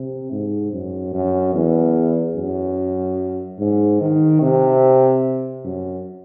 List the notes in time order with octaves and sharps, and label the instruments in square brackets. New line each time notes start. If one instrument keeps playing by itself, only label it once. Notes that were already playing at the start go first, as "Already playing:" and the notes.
Already playing: [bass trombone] C3
G#2
F#2
F#2
E2
F#2
G#2
D#3
C3
F#2